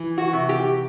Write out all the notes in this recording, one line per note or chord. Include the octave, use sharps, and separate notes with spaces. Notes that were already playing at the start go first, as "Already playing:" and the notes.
Already playing: E3
F#4
C3
G4